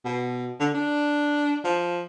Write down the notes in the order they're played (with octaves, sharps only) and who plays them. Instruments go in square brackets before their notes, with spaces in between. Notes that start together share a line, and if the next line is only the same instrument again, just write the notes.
[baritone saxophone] B2
D3
D4
F3